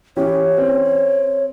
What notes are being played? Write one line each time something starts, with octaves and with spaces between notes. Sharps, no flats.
E3 C#4 G4 C#5
C4